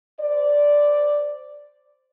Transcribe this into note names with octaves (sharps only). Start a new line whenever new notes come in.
C5 D5